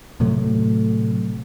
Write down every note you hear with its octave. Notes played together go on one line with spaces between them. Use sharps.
A2 C3 F#3 A3